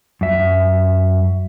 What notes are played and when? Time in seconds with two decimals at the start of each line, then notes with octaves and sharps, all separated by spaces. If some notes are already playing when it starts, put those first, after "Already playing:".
0.21 F#2 E5